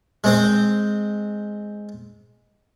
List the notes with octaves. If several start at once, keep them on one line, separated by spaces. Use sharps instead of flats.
G#3 C4 C5